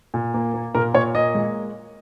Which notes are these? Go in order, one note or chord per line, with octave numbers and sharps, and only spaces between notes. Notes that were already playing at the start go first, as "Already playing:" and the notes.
A#2
A#3
A#3
A#2 A#4
A#2 C#5
A#3 D#5
G#3